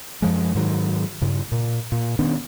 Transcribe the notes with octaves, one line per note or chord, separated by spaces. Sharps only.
F#2 F3 G#3
G#2 D#3 F#3
G2 C#3
A#2
A#2
D#3 B3 C#4 D4